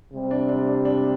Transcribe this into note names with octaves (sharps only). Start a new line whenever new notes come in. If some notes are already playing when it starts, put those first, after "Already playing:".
C3 G3 C4
D4
D4
D4
D4